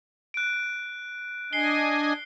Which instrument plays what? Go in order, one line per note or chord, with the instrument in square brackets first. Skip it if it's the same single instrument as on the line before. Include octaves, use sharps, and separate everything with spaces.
[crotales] F#6 D7
[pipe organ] D4 D#5 G#5 [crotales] C7 G7